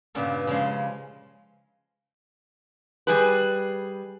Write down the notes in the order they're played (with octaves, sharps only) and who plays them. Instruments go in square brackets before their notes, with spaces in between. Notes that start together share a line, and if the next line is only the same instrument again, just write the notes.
[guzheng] G2 A#2 C#3 B3
C#3 F3 G#3
[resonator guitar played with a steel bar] G3 G#4 B4